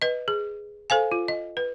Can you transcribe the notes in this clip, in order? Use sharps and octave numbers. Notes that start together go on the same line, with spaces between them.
B4 D#5
G#4
A4 C5 F5 G#5
F4
D#5
B4